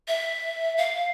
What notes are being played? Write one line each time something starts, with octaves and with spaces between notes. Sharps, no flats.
E5
F5